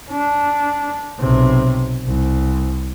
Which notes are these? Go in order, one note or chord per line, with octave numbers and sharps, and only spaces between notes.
D4
B1 C3
C2